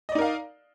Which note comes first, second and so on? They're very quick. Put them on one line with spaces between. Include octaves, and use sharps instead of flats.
D#5 D5 D#4 A#4 F5